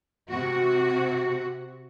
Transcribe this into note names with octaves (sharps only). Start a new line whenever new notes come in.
C3 F#4